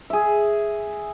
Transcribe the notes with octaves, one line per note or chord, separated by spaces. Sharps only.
G#4 E5